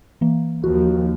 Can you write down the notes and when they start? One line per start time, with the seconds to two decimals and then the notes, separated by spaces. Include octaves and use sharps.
0.21 E3 A#3
0.64 D#2 F3 F#4